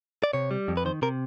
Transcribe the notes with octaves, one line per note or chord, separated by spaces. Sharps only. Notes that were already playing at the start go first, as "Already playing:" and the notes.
D5
C3 C#5
G3
F2
B4
D#3 C5
C3 A#4